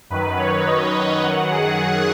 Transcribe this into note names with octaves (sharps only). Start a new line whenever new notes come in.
F#2 D#3 F#3 B4
C#5
D#5
D#5
F#2 D#3 F#3 F#5
G#4
G#4